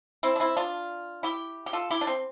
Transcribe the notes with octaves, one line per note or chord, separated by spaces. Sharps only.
C4 E4
D4
C4 E4
D4 F4
E4 G4
G4
F4 A4
E4 G4
D4
C4